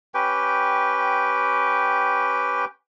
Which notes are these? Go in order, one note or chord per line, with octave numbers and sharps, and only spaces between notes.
C#4 G4 B4 G5